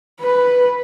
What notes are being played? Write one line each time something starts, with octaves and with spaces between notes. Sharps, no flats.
B4